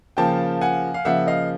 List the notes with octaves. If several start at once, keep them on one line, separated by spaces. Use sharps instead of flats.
C#3 F3 A#3 G5 A5
F#5 G#5
F5
C#3 F3 A#3 E5 F#5
D#5 F5